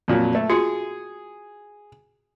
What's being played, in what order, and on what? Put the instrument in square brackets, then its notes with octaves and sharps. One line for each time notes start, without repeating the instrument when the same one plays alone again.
[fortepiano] F2 A#2 F#3
A3
[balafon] F4 F#4 [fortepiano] G#4